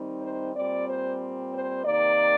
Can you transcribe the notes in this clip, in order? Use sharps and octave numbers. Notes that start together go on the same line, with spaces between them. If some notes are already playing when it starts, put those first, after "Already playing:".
Already playing: D#3 G3 C4 D#4
C5
A#2 G3 C4 D5
C5
C5
C3 D#3 A#3 D5